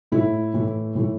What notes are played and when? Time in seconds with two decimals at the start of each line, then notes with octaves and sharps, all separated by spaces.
0.12 A2 A3 E4
0.54 A2 E3 A3
0.95 A2 E3 A3